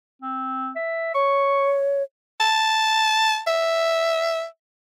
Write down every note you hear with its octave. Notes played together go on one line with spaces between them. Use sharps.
C4
E5
C#5 C#6
A5
E5